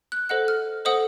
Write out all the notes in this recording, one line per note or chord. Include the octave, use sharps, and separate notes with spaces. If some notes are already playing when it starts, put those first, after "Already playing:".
F#6
A4 C5 D#5 F#5 F#6
F6
A4 C5 D#5 F#5 D#6